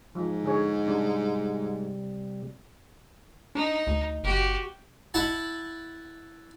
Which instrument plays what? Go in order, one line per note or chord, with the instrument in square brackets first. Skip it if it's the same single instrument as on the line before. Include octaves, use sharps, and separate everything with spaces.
[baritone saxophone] G#2 [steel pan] F3
[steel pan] D3 G#4 C#5
[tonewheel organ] C3 G3 [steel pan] D4
[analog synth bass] D4 [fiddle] D#4
[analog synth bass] D2
[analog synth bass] F#1 [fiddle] F#4 G4
[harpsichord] E4 F#5 A5